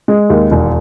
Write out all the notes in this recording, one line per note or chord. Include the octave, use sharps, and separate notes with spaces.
G#3
D#2
E1